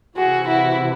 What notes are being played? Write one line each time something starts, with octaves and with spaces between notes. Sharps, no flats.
C3 E3 F#4 G#4
E4 F#4